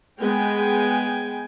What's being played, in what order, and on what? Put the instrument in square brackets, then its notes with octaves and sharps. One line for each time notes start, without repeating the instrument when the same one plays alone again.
[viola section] G#3 B3 G5 G#5